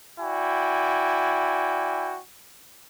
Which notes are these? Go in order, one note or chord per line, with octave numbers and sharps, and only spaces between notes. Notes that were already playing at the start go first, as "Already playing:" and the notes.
E4 F#4 D5 G5 G#5